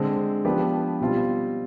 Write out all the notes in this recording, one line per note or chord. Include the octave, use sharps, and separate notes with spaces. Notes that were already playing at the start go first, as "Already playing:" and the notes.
Already playing: D3 G#3 C4
F3 B3 D4 G4 B4
B2 G3 C4 F4